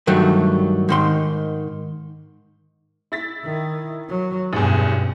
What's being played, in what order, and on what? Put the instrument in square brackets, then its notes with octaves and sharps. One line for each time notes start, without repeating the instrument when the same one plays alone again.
[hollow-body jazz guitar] G2 D#3 F#3 G3 A3
G#2 D#3 C6
[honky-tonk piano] E4 A6 B6
[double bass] D#3
F#3
[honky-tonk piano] A1 E2 [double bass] G2 B2